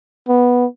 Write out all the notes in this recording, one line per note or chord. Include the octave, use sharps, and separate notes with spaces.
B3